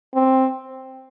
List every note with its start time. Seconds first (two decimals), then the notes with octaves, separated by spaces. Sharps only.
0.15 C4